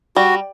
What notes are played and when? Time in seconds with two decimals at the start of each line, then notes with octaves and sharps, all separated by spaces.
0.16 G3 F#4